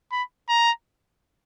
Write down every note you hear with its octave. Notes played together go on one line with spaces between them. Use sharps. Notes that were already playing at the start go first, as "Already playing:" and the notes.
B5
A#5